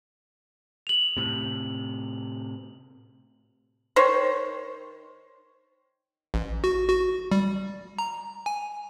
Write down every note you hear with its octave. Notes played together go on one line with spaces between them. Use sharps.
F7 F#7
A2 C3
D#3 C5 C#5
A1
F#4
F#4
G3
A#5
G#5